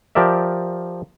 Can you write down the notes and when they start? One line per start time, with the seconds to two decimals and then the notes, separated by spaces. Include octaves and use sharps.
0.15 F3 G4 A#4 D5 E5